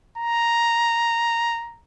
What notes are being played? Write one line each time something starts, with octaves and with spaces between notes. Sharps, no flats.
A#5